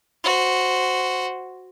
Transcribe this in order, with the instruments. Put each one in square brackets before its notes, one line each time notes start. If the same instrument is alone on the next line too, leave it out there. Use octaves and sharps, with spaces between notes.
[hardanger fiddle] F#4 C5